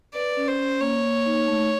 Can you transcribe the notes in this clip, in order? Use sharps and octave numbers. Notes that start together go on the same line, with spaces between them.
B4 D5
C#4
C5
C#4
A#3 C#5
A#3
D#4
A3